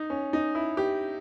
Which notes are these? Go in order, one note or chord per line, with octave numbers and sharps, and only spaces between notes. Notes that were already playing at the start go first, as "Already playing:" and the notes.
Already playing: D#4
C#4
D#4
E4
G4